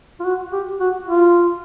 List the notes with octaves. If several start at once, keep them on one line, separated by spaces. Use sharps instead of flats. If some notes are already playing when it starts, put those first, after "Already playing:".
F4
F#4
G4
F#4
F4